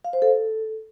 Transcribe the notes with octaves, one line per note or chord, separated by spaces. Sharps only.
F5
C5
A4